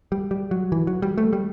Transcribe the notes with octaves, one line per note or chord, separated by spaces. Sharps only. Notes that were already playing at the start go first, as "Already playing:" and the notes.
G3
G3
F#3
E3
F#3
G3
A3
G3